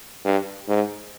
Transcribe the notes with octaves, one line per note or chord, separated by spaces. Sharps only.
G2
G#2